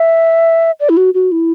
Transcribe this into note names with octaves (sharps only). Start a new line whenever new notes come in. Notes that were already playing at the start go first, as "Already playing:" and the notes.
Already playing: E5
D5
E4
F#4
F#4
E4